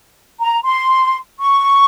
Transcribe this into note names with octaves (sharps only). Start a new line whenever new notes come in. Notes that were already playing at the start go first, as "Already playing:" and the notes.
A#5
C6
C#6